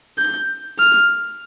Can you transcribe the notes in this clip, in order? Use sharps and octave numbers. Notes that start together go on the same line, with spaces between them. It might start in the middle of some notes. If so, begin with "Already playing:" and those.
G6
F6